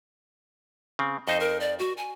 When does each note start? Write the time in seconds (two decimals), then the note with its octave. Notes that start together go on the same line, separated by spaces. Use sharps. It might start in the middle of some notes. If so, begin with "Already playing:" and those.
0.99 C#3 C4
1.28 F2 D#4 C5 D#5
1.40 A#4
1.60 D5
1.79 F#4
1.97 G#5